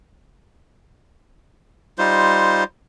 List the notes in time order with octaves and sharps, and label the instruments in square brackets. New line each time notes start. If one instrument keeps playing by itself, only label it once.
[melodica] G3 D#4 F4 C5